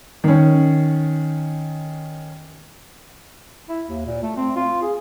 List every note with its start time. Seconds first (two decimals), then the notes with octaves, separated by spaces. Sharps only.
0.24 D#3 C#4
3.69 E4
3.87 D#2
4.06 A#2
4.23 A3
4.37 C4
4.56 F4
4.82 G#4